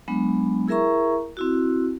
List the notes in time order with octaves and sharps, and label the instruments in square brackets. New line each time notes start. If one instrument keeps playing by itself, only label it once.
[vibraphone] F#3 G#3 B3 D4
E4 G#4 A#4 E5 A#5 C#6
C4 E4 F#4